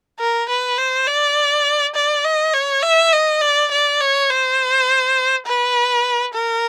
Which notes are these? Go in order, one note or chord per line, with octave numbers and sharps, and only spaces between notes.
A#4
B4
C5
D5
D5
D#5
C#5
E5
D#5
D5
D5
C#5
C5
B4
A#4